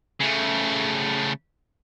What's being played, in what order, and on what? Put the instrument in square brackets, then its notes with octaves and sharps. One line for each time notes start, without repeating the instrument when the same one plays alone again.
[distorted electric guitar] C#3 A3